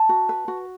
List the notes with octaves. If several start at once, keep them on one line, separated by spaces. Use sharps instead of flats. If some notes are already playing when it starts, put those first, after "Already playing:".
Already playing: A5
F#4
B4
F#4